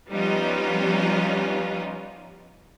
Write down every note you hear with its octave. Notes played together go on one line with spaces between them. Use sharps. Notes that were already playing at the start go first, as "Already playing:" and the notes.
F3 G3 B3 C#4 D#4 F4